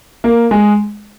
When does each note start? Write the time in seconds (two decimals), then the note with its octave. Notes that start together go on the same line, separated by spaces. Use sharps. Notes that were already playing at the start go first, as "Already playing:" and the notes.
0.24 A#3
0.51 G#3